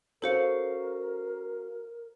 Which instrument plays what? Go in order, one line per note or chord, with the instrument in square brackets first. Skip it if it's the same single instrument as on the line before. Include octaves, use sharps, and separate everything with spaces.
[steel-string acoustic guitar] C#4 F#4 F5 [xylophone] A4 C5 C#7 [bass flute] A#4